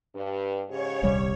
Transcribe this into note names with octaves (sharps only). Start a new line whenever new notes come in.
G2
G#2 C#3 G4 C#5
D#1 C2 G3